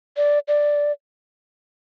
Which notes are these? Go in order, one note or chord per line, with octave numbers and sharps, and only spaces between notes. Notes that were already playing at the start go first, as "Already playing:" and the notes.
D5
D5